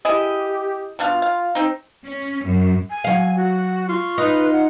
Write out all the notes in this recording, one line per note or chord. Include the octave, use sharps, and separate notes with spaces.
E4 G4 G#4 D#5
B2 D4 F4 F5
F5
C4 D#4
C#4
F#2
G#5
F#3 F5
F#4
F4 C#6
D#4 B4
F#5